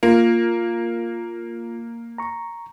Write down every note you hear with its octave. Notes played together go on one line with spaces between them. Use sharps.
A#3 F4
A#5 C#6